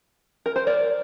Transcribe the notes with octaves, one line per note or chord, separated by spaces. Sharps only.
A#4
C5
A#4 D5